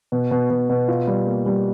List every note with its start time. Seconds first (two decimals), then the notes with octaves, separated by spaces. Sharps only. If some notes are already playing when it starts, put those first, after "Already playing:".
0.12 B2
0.31 B2
0.50 B2
0.70 B2
0.88 F4
1.07 G3
1.27 A#3
1.46 G3